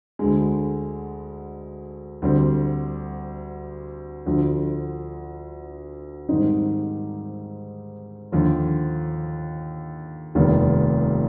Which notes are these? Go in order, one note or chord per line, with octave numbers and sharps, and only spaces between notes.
D2 D3 G#3
D2 D3 G3 C4
D2 D3 F3
G#2 D#3 G3 C4 D#4
D#2 D3 F3
F1 D#2 D#3 G3 B3